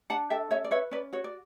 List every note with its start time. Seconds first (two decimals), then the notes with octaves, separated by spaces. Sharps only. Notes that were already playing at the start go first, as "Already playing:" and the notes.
0.10 D4 F#5 A5
0.30 A4 E5 G5
0.51 C#4 C#5 E5
0.64 D5
0.71 B4 C#5 E5
0.91 C#4 B4 D5
1.13 F#4 C#5
1.24 D5